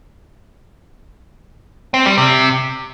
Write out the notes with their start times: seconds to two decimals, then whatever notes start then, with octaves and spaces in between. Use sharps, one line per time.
1.94 C4
2.06 G3
2.18 C3